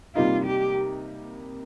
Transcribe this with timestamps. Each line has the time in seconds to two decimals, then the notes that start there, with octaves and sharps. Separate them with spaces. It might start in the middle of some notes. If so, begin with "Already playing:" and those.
0.15 C3 G3 A#3 D#4 F4
0.45 G4